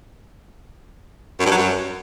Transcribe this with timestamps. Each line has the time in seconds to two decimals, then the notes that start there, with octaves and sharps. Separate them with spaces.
1.40 F#2
1.46 G2
1.52 F#3
1.57 F#2